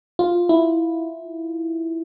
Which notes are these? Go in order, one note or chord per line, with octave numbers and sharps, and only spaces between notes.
F4
E4